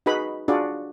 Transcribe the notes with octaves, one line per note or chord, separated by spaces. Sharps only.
D#4 F#4 G#4 B4 B5
D4 F4 F#4 G#4 D5